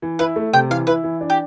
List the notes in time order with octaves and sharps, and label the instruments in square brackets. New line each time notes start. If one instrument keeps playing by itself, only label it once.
[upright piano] E3
[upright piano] E4 [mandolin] B4
[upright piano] A3
[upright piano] C3 [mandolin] G5
[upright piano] E3 [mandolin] F5
[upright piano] E4 [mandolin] B4
[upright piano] E3
D4
[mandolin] G4